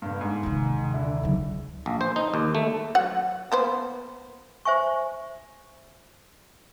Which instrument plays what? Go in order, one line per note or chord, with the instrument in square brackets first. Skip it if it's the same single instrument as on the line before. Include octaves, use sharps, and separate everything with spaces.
[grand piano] G1 G2
G#2
[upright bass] D#2 C3
[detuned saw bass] D#3
[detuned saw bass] D3 [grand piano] E4
[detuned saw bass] C#2 [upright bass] F#3 D#4
[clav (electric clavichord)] A#1
C5
D#4
D#2
A3
[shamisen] F#3 F#5
A#3 B3 C5
[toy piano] C5 E5 G#5 C#6